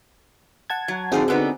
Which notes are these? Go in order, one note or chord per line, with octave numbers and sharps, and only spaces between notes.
F#5 A5 G#6
F#3
D3 F3 C4 D#4 F#4 G#4
D3 B3 D#4